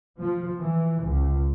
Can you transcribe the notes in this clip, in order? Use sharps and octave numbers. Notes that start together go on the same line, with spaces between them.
F3
E3
C#2